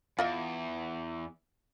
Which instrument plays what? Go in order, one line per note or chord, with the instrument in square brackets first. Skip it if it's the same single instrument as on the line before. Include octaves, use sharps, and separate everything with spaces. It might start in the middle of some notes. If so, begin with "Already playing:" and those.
[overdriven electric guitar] E2 [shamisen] F4 D#5 E5